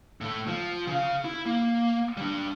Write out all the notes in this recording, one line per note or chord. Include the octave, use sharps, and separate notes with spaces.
A2 A3
F3
C#3 F5
E4
A#3
G3 D4